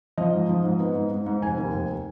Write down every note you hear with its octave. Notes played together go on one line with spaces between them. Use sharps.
F3 D#5
G#2
F3
G#2
B3
G#2
G#2
G#2
F1 G#5
D#2
F1